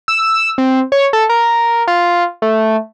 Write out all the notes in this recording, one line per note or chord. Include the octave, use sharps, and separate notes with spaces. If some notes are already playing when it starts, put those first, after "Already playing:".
E6
C4
C#5
A4
A#4
F4
A3